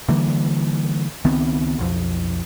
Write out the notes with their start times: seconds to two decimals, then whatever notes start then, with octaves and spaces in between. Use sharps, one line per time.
0.08 D3 E3 G3 A#3
1.25 C#2 D#3 B3 C4
1.78 B1 F2